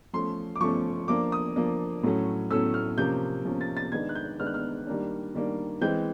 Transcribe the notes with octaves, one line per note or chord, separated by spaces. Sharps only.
F3 A3 C#4 C6
D6
F3 A3 C#4 C#6
F3 A#3 D4 D6
D#6
F3 A#3 D4
A2 F#3 A3 C#4
A2 F#3 A3 C#4 E6
F6
C3 F3 A#3 C#4 G6
C3 F3 A#3 C#4
A6
A6
D#3 G#3 B3 D4 G#6
F#6
G6
D#3 G#3 B3 D4 F6
F#6
F6
D#3 G3 A#3 D4
D#3 G3 A#3 D4
E3 G#3 C4 G6